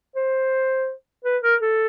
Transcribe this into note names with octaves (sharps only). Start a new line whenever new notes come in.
C5
B4
A#4
A4